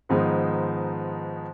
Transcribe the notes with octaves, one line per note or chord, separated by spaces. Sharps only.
G#2 D#3 F3 G#3 B3 D#4